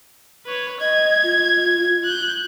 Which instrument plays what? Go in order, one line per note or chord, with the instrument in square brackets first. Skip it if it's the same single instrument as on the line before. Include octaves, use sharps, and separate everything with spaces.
[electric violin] B4 C#5
[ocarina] D#5 [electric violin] G#6
[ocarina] F4
[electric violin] F#6 G6